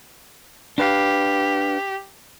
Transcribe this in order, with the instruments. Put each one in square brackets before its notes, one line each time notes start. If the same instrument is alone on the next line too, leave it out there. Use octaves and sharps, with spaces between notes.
[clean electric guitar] D4 B4 F5 [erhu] G4